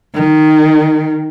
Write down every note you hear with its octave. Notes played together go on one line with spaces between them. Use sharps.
D#3